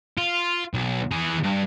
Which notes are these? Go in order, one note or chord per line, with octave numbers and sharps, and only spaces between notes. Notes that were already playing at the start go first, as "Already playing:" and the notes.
F4
B1
E3 G#4
G2